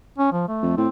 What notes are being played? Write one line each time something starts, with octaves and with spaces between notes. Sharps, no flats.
C#4
F3
A3
F2
A2 C4